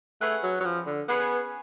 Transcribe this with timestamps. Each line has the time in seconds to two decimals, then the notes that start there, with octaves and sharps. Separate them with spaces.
0.21 A3 C#4 G#4 B4 F#5
0.43 F#3
0.60 F#3
0.65 F3
0.86 D3
1.08 B3 C#4 G#4 B4 F#5